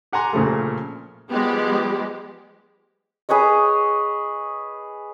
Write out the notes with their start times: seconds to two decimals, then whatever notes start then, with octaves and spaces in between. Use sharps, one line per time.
0.13 G4 F#5 G#5 A#5 C6
0.33 A#2 C#3 F3 A3
1.31 F3 G3 G#3 B3 G4
3.29 G#4 B4 C#5 D#5